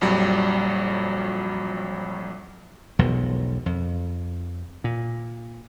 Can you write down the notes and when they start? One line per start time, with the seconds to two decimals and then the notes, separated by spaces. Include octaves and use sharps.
0.01 A#1 F2 F#3 G3
2.99 E1 B1 B2 F3
3.66 F2
4.84 A#2